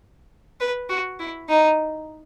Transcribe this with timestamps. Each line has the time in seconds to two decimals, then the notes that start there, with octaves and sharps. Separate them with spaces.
0.60 B4
0.89 F#4
1.19 E4
1.49 D#4